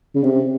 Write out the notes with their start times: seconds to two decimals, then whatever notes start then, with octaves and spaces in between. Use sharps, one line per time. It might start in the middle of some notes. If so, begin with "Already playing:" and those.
0.15 C#3
0.24 C3